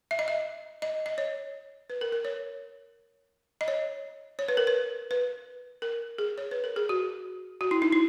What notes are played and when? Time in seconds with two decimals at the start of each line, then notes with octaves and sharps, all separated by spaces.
0.11 E5
0.19 D#5
0.28 E5
0.82 D#5
1.06 D#5
1.18 C#5
1.90 B4
2.01 A#4
2.12 A#4
2.25 C#5
3.61 D#5
3.68 C#5
4.39 C#5
4.48 B4
4.57 A#4
4.67 B4
5.11 B4
5.82 A#4
6.18 G#4
6.38 C#5
6.51 B4
6.64 A#4
6.76 G#4
6.89 F#4
7.61 F#4
7.71 E4
7.82 D#4
7.93 E4